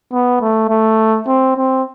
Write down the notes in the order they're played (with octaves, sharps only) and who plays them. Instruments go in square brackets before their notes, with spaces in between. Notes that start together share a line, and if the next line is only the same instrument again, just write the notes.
[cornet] B3
A3
A3
C4
C4